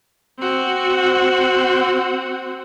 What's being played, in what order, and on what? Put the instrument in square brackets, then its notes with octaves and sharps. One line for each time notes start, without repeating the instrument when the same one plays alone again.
[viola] C4 F#4